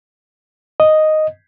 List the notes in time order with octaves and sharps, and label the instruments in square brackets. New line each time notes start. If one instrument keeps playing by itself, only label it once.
[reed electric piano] D#5